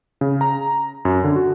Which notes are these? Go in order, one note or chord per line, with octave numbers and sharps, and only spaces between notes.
C#3
A#5
F#2
D3
F#4